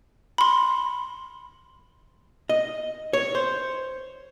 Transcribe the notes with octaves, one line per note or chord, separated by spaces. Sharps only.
B5 C6
D#5
C#5
C5